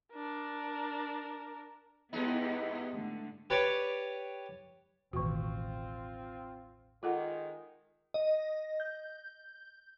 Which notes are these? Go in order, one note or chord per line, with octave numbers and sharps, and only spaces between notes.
D4 A#4
G2 G#3 B3 D#4 E4 G4
G#2 D3 A3
G4 B4 C#5 D5
E1 A1 D#3 C4 F4 F#4
D#3 G#3 F4 A4 F#5
D#5
G6